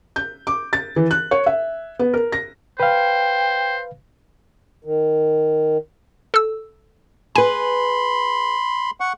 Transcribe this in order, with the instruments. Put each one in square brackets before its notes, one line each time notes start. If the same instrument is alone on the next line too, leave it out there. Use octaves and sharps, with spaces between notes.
[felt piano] G6
D6
A6
E3
F#6
C#5
E5
B3
A#4
A#6
[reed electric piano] B4 F5 [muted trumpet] C5 [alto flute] G5
[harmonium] D#3
[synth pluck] A4 E6
[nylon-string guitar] G#4 B4 [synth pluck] G#5 [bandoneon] B5 C6
[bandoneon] F#5 C#6